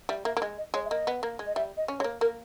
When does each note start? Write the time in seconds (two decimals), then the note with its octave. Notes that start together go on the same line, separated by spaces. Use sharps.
0.09 G3 E5
0.25 A#3 E5
0.37 A#3
0.41 G#3 D#5
0.58 D#5
0.74 G#3 C#5
0.85 E5
0.90 A#3 D#5
1.07 B3
1.23 A#3
1.39 G#3
1.46 D#5
1.55 G3 E5
1.77 D#5
1.88 C#4
1.99 G#3 C#5
2.04 A#3
2.21 A#3 A#4